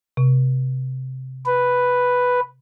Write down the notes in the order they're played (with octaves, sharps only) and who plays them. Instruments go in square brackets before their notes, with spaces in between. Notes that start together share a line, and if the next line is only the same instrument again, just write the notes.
[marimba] C3
[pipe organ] B4